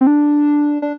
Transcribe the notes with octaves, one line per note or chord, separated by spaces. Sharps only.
C4
D4
D4